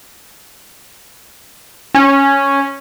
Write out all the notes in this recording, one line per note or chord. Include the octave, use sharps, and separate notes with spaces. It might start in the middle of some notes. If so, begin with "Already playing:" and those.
C#4